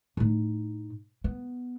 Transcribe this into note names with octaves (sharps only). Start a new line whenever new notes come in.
A2 D#4
B3